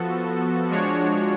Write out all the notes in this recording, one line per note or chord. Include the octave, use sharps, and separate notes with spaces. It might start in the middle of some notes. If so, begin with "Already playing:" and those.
Already playing: F3 B3 F#4 A4
F3 G#3 D4 F#4 C#5